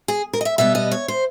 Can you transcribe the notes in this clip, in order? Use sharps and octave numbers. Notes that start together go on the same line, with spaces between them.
G#4
A#4
D#5
E5
B2 G3 B3 E5
D#5
C#5
C5